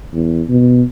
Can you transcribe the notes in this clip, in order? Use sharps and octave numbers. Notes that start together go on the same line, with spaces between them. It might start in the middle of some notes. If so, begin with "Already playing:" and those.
E2
B2